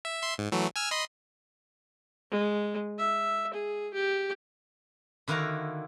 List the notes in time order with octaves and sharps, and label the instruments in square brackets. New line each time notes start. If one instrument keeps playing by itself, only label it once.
[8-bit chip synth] E5
E5 C6
G#2
E3 F#3 A3
G#5 E6 F6
D#5 B5 C6
[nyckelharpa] G#3
E5
G#4
G4
[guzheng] D3 D#3 E4 F#4 F5 A#5